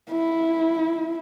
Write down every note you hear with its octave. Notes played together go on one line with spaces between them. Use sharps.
E4